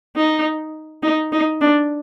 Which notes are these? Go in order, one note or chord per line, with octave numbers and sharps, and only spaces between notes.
D#4
D#4
D#4
D4